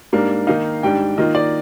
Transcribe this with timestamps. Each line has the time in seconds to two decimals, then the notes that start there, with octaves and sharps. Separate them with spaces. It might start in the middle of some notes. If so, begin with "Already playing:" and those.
0.12 G#2 G3 A#3 D4
0.47 D#3 A#3 D#4 F5
0.83 G#2 G3 D4 G5
1.18 D#3 A#3 F4 D#5
1.35 D5